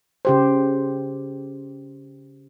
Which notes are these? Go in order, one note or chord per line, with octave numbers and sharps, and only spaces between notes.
C#3 G4 C5